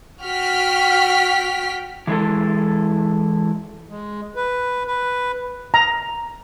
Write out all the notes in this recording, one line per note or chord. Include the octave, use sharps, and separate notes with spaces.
F#4 G5 F6 B6
E3 G#3 E4 A4
G#3
B4
B4
A#5